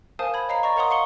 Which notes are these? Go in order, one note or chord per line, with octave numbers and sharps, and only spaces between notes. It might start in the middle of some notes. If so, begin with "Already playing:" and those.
A#4 C5 F5 G#5 A5 D#6
B5 G#6
C#5 D#5 F5 A#5 C7
D5 D#5 A#5 C#6
A#4 C#5 F#5 A#5 C6 D#6
F5 C#6 C#7 G7